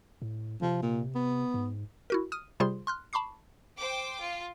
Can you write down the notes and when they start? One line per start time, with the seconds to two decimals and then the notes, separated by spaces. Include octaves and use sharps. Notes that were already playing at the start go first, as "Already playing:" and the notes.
0.22 A2
0.62 C3 F3
0.82 A#2
1.15 B3
1.54 G#2
2.10 E4 F#4 A#4
2.32 D#6 F6 D#7
2.60 C3 G3 F4 G#4 C5 C6
2.87 C6 F6 F#6
3.13 A5 B5 C#6 D6 C7
3.78 C5 G5 D6
4.20 F4